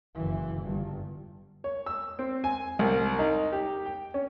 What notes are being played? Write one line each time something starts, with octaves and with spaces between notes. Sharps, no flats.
F#1 E3
G1 G2
C#5
E6
C4
G#5
C2
D#4
G4
G5
C#4